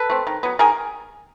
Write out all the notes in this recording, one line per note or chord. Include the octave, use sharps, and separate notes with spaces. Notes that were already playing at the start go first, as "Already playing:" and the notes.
Already playing: A4 B4
A3 C4
D#3
F#3 B3
D#3 G#4 A#4